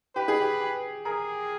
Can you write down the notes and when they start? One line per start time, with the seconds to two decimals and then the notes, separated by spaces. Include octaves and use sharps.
0.16 G4 B4
0.28 G#4
0.41 G4
0.60 G4
1.05 G#4 A#4